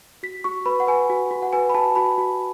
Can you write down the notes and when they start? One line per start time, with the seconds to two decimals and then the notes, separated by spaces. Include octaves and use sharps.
0.23 F#4 B6
0.44 F#4 C#6
0.66 B4 B5
0.80 F#5
0.87 B4 G#5
1.10 F#4
1.31 F#4
1.42 F#5
1.53 B4 G#5
1.69 B5
1.74 F#4 A5
1.95 F#4 B5
2.18 F#4